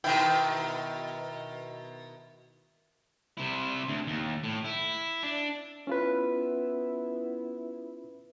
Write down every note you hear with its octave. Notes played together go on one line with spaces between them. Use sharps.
B2 D#3 E4 G5
C3 E4
D2
D#2
A2
E4
D4
B3 C#4 E4 F4 B4